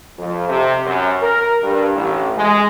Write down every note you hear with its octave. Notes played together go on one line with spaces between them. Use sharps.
F2
C3
F#2
A#4
G2
A1
G#3